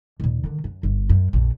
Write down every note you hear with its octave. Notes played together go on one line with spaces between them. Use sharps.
D#2 A#2
D3 D#3
F#2
G1
F#2
A#1 F2